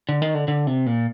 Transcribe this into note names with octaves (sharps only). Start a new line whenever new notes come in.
D3
D#3
D3
D3
C3
A#2